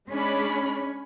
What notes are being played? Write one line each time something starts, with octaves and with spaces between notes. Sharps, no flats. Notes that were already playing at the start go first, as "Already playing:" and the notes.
G#3 C#4 D4 B5